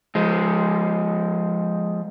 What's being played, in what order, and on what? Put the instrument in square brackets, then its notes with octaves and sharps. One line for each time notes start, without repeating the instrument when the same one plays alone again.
[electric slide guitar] F3 G#3